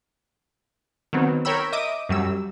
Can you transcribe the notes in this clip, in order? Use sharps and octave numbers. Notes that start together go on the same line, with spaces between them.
D#3 F#3 B3 C4
A#4 C#5 G5 B5 E6
D#5 E5 D6 D#6
F#2 F#3 G3 E6